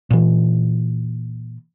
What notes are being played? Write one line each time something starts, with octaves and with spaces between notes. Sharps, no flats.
A#2 E3